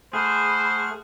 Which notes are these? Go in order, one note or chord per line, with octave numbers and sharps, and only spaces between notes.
A3 G#4 C5 F#5 B5 F6